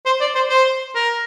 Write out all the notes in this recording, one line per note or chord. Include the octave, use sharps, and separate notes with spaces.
C5
D5
C5
C5
A#4